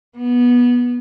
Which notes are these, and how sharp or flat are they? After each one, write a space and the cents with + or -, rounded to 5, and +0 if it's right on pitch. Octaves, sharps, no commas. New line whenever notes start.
B3 -20